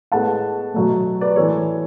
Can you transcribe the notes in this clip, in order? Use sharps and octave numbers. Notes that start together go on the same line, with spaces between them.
A2 G#3 B3 F#5 A5
B2 F#3 A3
B4 D5
A2 E3 B3 A4 C#5